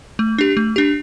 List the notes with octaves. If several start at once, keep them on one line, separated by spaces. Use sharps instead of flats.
A3
D4 G4
A3
D4 G4